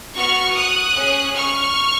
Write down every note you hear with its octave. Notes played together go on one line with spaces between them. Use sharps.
B3 F#4 C#6 F6
D#6 F#6
C#4 G#4
C#6 F6